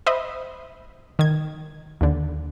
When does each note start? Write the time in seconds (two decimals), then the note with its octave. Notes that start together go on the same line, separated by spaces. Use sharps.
0.06 C5 D#5 E5 B5
1.19 D#3 G#6
2.01 D#2 D3